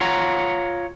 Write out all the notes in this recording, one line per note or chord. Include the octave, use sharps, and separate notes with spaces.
F4 C#5 F#5 A#5